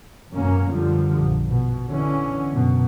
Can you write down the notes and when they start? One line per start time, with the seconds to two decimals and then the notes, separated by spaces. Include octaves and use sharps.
0.33 G#1 F#2 B2 A#3 C#4
0.68 F#2 D3 F3 G3
1.20 A#1
1.50 B2
1.88 D3 E3 C#4
2.53 F#2 B2